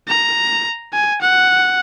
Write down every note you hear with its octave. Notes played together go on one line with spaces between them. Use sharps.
A#5
G#5
F#5